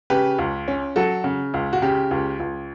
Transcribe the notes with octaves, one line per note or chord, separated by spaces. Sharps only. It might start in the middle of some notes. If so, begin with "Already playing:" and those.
C#3 G4 B4
C#2
C#4
F#3 F#4 A4
C#3
C#2
F#4
C#3 G4
C#2
C#2